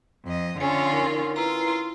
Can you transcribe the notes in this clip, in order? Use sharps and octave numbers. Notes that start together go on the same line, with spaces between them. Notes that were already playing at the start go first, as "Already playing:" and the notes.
F2 D#5
D3 C#4 F4 G#5
D#4 A#4
E4 F4 B4 A#5 C6